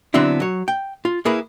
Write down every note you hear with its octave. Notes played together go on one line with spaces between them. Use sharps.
D3 F#3 B3 C4 D4 E4
F#3 C#5
G5
F4
A#3 E4 G#4 A#4 B4